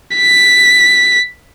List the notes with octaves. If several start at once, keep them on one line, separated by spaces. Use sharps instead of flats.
B6